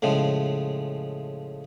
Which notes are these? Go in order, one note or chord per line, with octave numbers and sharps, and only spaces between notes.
A2 C#3 F3 G#3